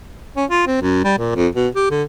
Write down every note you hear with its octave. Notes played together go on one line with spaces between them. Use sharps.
C#4
F4
C4
F#2
G3
A#2
F2
B2
G4
D3